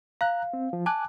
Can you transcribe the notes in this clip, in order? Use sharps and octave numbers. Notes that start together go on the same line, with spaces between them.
F5 A#5 F#6
C4
F3
G#5 A5 D6 F#6